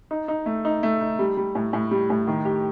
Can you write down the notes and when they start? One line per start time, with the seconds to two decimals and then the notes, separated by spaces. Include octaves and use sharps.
0.11 D#4
0.28 D#4
0.46 A3
0.65 D#4
0.83 A3
1.01 D#4
1.19 G3
1.37 G3
1.55 A2
1.73 A2
1.91 G3
2.10 A2
2.27 D#3
2.45 G4